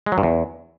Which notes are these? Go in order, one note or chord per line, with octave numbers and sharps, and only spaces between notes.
G#3
F#3
G2
E2